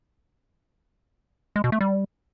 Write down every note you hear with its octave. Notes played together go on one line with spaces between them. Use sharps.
G#3
B2
A3
G3